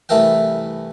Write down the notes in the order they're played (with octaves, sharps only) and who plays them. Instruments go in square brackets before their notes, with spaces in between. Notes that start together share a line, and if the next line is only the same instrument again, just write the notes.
[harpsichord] C2 E3 A3 A4 A#4 G5